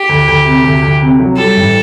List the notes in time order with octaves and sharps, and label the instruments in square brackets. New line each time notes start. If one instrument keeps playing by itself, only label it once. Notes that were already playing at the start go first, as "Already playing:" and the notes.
Already playing: [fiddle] G4
[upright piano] D2
D2
C3
D2
D2
C3
F#3
[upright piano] G3 [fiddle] A4
[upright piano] A1